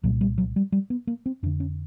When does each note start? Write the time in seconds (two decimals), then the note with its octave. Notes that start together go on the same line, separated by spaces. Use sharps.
0.03 C2 A#2 F#3
0.21 G3
0.38 F#3
0.56 G3
0.72 G3
0.90 B3
1.07 A#3
1.26 C4
1.43 F2 D4
1.46 D3
1.60 C#4